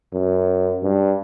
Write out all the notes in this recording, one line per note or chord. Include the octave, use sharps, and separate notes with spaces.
F#2
G2